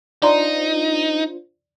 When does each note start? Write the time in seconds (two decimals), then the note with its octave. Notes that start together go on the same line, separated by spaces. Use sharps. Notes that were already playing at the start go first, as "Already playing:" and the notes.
0.23 D4 D#4 F4 C5 D5 A#5 C6